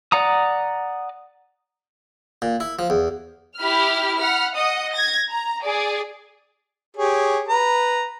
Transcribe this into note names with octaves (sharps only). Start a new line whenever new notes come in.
D5 F#5 A#5 D#6
A#2
E4
F3
E2
E4 G4 B5 F6
F#5 B5 F6
D#5 F#5 D#6
G#6 A#6
A#5
G#4 D5
G4 G#4 C#5
B4 A#5